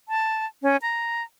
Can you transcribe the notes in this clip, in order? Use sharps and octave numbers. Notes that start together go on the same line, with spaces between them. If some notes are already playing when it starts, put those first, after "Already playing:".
A5
C#4
A#5